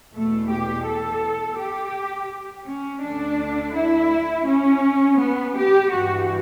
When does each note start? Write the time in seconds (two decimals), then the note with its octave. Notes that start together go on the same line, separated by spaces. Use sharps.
0.14 E2 B2 A3
0.50 G4
0.86 A4
1.59 G4
2.66 C#4
3.03 D2 D3 D4
3.75 E4
4.47 C#4
5.19 B3
5.55 G4
5.91 G2 E3 F#4